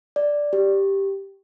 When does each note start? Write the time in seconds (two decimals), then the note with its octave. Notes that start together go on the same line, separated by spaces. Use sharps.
0.16 D5
0.53 G4